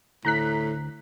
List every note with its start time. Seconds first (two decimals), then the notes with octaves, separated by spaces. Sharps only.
0.25 D2 A2 A#5 F#6 B6